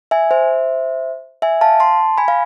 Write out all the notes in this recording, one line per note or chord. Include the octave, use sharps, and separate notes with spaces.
E5 G#5
C5 E5
E5 G#5
F5 A5
A5 C6
G#5 B5
F5